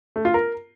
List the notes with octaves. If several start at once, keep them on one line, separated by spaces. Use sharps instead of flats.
A3
F4
A#4